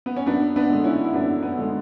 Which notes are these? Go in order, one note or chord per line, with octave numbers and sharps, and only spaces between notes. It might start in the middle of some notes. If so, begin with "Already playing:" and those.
B3
C#4
F#2 B3 D4
B3 D4
D3 G#3
C#4 E4
E4
F#2 B3 D4
B3
D3 G#3